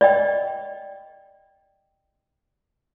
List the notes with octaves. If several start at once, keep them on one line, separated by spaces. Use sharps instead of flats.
D5 D#5 G5